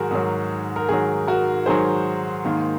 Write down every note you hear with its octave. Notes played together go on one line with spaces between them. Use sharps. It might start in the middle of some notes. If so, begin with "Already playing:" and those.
Already playing: G#2 D#3 F#3 F#4 G#4 A#4
G#2 D#3 F#3
A#4
G#2 D#3 F#3 G#4
F#4 A#4
G#2 D#3 F#3 G#4 C5
G#2 D#3 A#3